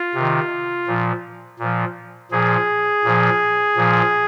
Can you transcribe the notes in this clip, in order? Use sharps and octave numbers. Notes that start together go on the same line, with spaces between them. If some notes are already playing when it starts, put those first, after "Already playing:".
Already playing: F4
C3 D#3
A#2 F3
A#2 F3
A#2 F3 G#4
A#2 F3
A#2 F3